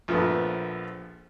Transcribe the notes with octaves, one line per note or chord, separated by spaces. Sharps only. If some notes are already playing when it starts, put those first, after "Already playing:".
A#1 F3 A3 B3